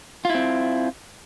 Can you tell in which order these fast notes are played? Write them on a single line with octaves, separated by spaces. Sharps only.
F4 E4 C4